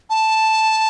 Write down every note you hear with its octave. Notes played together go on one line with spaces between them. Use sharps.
A5